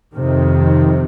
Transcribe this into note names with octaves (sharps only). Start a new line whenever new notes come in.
F2 C3 D#3